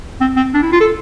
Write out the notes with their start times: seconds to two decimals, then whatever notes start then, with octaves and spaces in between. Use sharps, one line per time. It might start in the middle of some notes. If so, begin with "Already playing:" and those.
0.21 C4
0.37 C4
0.54 D4
0.62 E4
0.72 F4
0.80 A4